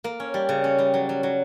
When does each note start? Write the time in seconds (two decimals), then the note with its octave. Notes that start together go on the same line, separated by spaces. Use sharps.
0.04 A#3
0.20 C#4
0.34 G3
0.49 C#3
0.64 C#4
0.79 G3
0.94 F#3
1.09 F#3
1.23 F#3